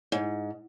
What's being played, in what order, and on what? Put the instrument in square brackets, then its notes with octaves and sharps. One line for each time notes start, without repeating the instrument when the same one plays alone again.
[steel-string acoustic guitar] G#2